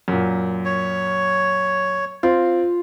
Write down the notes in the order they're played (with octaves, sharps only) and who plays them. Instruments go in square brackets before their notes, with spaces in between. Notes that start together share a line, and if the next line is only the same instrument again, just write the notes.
[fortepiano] F#2 A#2
[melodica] C#5
[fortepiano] C4 [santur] F4